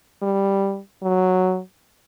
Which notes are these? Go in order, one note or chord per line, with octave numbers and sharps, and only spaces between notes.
G3
F#3